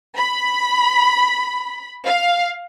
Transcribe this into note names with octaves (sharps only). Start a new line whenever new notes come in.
B5
F5